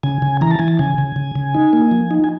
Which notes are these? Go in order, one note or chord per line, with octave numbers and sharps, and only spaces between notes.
C#3 G#5
C#3
E3 A#5
A5
E3 G#5
A5
C#3 G#5
C#3
C#3
C#3
D#4
A#3
F3
D#4
G#5